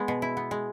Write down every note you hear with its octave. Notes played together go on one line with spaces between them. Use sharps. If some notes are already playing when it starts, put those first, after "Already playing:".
Already playing: G#3 B3
B2
E4
B3
G#3